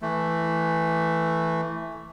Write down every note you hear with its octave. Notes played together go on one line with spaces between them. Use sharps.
E3 A3